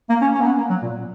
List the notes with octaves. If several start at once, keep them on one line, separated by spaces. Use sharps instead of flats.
A#3
C#4
C#4
A#3
B3
A#3
F#3
A#2